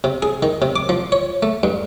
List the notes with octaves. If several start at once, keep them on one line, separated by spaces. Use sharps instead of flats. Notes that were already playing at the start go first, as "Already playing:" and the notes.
C3
G#4
D#3
C3
D6
F3
C#5
A3
G2